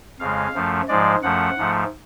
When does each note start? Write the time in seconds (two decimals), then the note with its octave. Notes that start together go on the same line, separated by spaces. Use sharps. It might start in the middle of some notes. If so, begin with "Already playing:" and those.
0.19 F2 C#3 G#3 F5
0.54 F#2 F3 A3
0.88 G#2 F3 G#3 D5
1.22 F#2 F3 A3 F#5
1.57 G#2 F3 A3